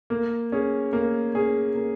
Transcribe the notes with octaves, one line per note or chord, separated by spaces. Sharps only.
A#3
C#4 G#4
A#3
C#4 G#4
A#3